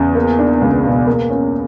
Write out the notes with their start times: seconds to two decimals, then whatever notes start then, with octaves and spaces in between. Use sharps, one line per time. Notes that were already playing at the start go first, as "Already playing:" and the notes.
Already playing: E2 C#3
0.15 A#3
0.39 D4
0.61 C#2
0.84 B2
1.07 A#3
1.30 C#4